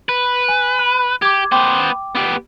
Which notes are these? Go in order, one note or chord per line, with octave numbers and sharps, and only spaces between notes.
B4
G#5
B5 F#6
G4 D6 G#6
B3 C5 G5 D6
B3 G4